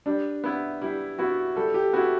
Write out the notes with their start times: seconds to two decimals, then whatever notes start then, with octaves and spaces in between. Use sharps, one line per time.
0.06 G3 D4
0.44 B3 E4
0.81 G3 E4
1.19 B3 E4 F#4
1.56 G3 A4
1.74 G4
1.93 B3 E4 F#4